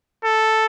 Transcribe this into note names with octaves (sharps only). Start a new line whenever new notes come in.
A4